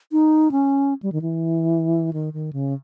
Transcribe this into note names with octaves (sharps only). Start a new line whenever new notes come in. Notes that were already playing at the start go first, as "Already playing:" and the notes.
D#4
C#4
G3
D#3
E3
D#3
D#3
C#3